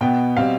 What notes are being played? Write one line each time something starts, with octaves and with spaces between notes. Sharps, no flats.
B2 B3 G5
B2 G3 C4 F5